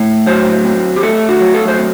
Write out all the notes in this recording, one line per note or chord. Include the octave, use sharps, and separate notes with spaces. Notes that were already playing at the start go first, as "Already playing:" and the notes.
Already playing: A2
F#3 C5
C4
G4
A3 A4
F#4
F#3
A4
C5
C4